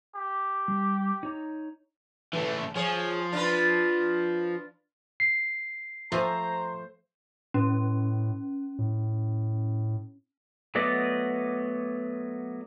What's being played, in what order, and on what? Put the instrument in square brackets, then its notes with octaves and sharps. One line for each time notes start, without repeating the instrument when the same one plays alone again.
[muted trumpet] G4
[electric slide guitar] G3
D#4 C#5 A#5
[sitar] C#3 [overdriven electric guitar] E3 A3
[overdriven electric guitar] F3 [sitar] G#4 C#5
[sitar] D4 F4 B4
[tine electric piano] C7
[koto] F3 A3 G#5 [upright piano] C5 [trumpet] A#5
[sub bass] A2 [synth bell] C#4
[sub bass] A2
[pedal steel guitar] F#3 A3 B3 D5 D#5